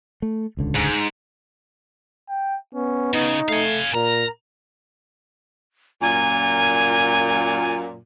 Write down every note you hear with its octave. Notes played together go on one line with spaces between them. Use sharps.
A3
D#1 C#2 D3
G#2
G5
B3 C#4
C#3 D#4
A3 F5 G#5
A#2 A#4 A#5
F#2 A#2 G#5